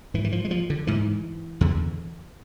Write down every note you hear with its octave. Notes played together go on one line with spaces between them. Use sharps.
G#2 E3
E3
F3
G#3
F3
D3
G#2 E3
E2 D3